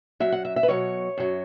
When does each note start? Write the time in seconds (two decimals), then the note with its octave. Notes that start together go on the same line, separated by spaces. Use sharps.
0.20 F#2 F#3 E5
0.32 F#5
0.45 E5
0.56 E5
0.63 B4
0.68 B2 F#3 C#5
1.17 F#2 F#3